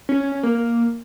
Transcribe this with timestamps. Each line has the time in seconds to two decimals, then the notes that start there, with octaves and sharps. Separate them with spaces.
0.09 C#4
0.20 C#4
0.32 C#4
0.43 A#3
0.55 A#3